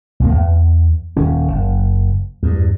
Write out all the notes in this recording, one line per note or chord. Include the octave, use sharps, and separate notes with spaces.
B1 F2 A#3
E2
D#1 D#3 C#4
F#1
E2 G2